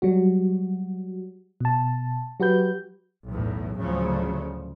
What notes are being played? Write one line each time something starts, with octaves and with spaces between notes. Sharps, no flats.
F#3 G3 F#4
B2 A5
F#3 F#4 G4 B4 G6
B1 E2 A2
D2 A2 C#3 F3 F#3